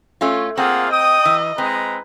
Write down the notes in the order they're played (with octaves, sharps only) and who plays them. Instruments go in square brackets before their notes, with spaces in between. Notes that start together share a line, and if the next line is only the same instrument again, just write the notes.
[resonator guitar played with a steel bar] A3 C#4 F4
[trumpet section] A#3 F4 G#4 [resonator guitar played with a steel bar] C4 [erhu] F#5
[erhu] D#5 [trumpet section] G5 D#6
[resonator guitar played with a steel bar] E3
[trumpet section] G#3 B4 A#5 [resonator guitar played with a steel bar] C4